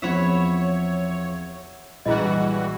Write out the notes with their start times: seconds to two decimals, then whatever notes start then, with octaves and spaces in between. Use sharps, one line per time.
0.02 E2 F3 C4 C#5 E5 F#5 B5
2.06 A#1 E3 G3 G#3 E4 F#4 G#4 D#5